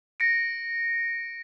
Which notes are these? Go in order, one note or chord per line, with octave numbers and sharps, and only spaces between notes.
A#6 C#7 D7